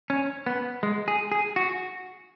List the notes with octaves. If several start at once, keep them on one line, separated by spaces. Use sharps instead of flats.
C#4
B3
G#3
G#4
G#4
F#4